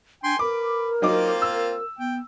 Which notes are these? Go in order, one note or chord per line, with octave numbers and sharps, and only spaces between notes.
D4 G5 G#5 C6
A#4 B4 D6
F#3 A#3 C4 D#4 F4 D6
E6
B3 G5